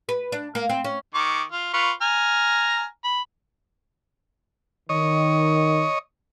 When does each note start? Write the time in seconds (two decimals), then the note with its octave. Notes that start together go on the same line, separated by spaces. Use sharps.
0.09 B4
0.32 D4
0.55 A#3
0.69 C4
0.84 C#4
1.15 D#3 C#6 D6
1.52 F4
1.74 F4 B4 C#6
2.02 G#5 A#5 F6
3.04 B5
4.89 D#3 C#5 D#5